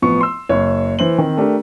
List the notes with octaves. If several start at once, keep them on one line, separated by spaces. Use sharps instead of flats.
A1 F3 B3 C#6
C6 E6
F#1 C#5
E3 C5 F#7
D#3 C4
A3 D4 G4 A#4